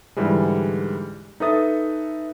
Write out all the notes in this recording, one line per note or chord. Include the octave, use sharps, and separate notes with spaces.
G#2 D3 E3 G3 G#3
D#4 A4 B4 E5 D#6 A6